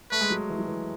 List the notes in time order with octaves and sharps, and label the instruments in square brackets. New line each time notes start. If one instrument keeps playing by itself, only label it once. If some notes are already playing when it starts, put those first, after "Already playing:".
[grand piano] A3 [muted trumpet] B4
[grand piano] G#3
F#3
E3
F#3
E3